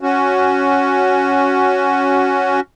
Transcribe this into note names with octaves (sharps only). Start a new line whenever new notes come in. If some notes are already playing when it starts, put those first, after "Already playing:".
C#4 F#4